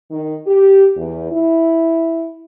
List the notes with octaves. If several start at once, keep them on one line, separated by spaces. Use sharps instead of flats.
D#3
G4
E2
E4